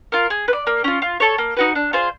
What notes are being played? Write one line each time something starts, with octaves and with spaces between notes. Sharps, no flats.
F4 A#4
G#4
B4
D5
A#3
C#4 F4
F4
A4 C#5
A#3
D#4 F#4 B4
D4
F4 G#4 C5